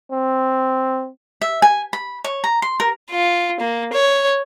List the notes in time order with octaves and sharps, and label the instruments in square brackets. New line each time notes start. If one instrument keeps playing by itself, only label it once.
[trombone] C4
[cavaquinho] E5
G#5
B5
C#5
A#5
C6
A#4
[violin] F4
A#3
C#5